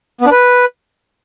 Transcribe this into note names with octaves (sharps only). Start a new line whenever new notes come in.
B3
D4
B4